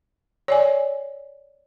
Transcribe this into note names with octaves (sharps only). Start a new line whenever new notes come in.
C#5 D5 G#5